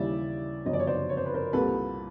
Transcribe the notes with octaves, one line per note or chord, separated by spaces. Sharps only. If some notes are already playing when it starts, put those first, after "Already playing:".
Already playing: D#2 C#3 E3 G3 D5 E5
G1 F#2 C#3 F3 D#5
D5
C#5
C5 D5
C#5
C5
B4
A#4 C5
C2 A#2 G3 A4 B4